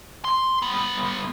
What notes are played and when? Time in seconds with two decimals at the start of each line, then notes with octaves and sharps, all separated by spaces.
0.25 C6
0.62 G3 B3